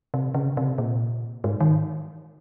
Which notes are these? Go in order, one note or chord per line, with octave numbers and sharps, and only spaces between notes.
C3
C#3
C3
A#2
G#2
D#3